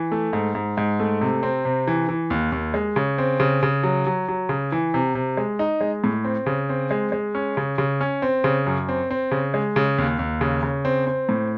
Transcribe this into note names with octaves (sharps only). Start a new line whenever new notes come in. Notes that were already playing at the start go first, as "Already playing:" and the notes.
Already playing: E3
A3
G#2
G#2
G#2
A3
C3
C4
C3
E3
E3
D#2
D#2
G#3
C#3
C4
C#3
C#3
F#3
F#3
F#3
C#3
E3
C3
C3
G#3
D#4
G#3
A2
C4
C#3
C4
G#3
G#3
C#4
C#3
C#3
C#4
C4
C#3
F#2
C4
C4
C#3
G#3
C#3
D#2
D#2
C#3
C#3
C4
C4
A2